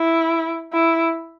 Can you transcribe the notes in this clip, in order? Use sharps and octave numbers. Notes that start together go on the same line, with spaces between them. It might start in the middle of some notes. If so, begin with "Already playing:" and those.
Already playing: E4
E4